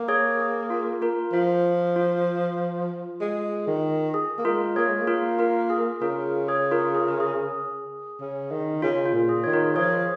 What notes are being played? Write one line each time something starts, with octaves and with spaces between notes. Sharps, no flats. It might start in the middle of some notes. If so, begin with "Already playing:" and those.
Already playing: A#3
G#4 C#5
G#4
F4
F4 A#4
F3 F4
F4
G#3
D#3
G#4
A#3
G#3 F4 A#4
A#3 G#4 C#5
G#3
A#3
F4 A#4
F4 A#4
G#4
C#3 F4 A#4
G#4 C#5
F4 A#4
G#4
A#4
G#4
C#3
D#3
C#3 F4
F4
A#2
G#4
D#3 C#5
F4 A#4
F3 G#4 C#5